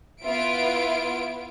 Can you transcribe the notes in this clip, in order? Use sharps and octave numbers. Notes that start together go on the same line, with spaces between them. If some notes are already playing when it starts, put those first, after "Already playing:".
B3 E4 F4 E5 D7